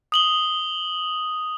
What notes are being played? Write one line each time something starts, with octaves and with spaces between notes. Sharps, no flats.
D#6 F#7 G7